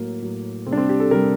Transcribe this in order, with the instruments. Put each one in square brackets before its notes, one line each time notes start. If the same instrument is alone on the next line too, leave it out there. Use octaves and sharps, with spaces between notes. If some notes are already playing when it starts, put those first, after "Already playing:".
Already playing: [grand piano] A2 F#3 A#3
A2 F#3
C3 C4
G3 D4
C4
G4
A4
C3 G3 A#4